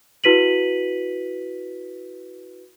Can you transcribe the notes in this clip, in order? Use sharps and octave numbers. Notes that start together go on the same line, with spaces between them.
E4 F#4 B4 B6 D#7 F#7